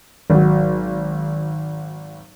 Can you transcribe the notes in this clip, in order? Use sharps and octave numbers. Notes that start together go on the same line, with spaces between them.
G#1 F#3